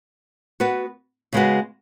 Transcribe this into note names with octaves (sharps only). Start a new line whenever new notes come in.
B3 F#4 B4
C#3 G#3 B3 F#4 B4